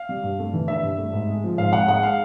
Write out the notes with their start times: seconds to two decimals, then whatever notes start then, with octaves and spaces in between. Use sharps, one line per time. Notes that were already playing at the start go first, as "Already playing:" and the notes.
Already playing: F5
0.09 G3
0.23 G2
0.39 A3
0.53 E3
0.68 D4 E5
0.83 G2
0.98 A3
1.13 G#2
1.29 G#3
1.44 F3
1.58 G#2 F5
1.73 G#2 F#5
1.88 G#3 F#5
2.03 F5